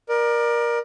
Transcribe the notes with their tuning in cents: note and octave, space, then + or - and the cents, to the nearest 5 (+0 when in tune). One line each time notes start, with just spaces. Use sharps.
A#4 +20 D5 +30